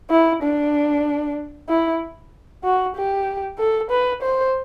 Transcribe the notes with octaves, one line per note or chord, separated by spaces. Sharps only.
E4
D4
E4
F#4
G4
A4
B4
C5